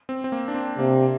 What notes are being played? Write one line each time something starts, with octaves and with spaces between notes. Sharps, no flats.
C4
C4
A#3
D4
C4
C3 A#3